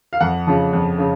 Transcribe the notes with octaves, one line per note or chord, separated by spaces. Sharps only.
F5
F2 F#5
C#3 F3
F2
C#3